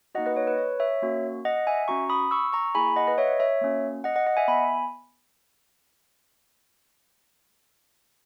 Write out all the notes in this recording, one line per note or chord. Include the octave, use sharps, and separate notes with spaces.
A#3 D#4 F#4 D#5 F#5
B4 D#5
C#5
B4
C#5
C#5 E5
A#3 C#4 F#4
D#5 F#5
E5 G#5
C#4 F#4 A#5 C#6
B5 D#6
C#6 E6
A#5 C#6
A#3 E4 G#4 G#5 B5
D#5 F#5
B4 D#5
C#5 E5
C#5 E5
A#3 C#4 F#4
D#5 F#5
D#5 F#5
D#5 F#5
E5 G#5
B3 G#5 B5